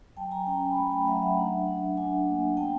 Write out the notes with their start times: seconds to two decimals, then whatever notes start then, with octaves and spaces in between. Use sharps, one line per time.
0.17 F#3 G5 A5
0.31 G#5 A#5
0.47 C#4 G5 A5
0.62 G#5 A#5
0.71 B5
0.77 A3 G#5 A#5
0.91 G5 A5
1.06 F#3 E5 F#5
1.22 E5 F#5
1.37 D4
1.67 D4
1.97 D4 F#5 G#5
2.27 A#3
2.57 B3 G5 A5